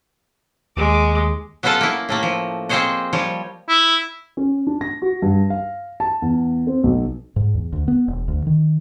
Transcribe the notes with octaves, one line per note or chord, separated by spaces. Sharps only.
D#2 G#3 D6
F#3 B3 C#4 F4 A4 A5
A#3 E4
A2 A3 A#3
F3
A#3 C4 G#4 C5 C#5 D#5
F3 G3 C#5
E4
C#4
D4
A#6
F#4
G2
F5
A5
E2
C4
B1
G#2
E2
D2
B3
E1
D2
D#3